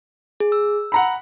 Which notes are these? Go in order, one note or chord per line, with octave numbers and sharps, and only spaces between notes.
G#4
E6
F#5 A#5 B5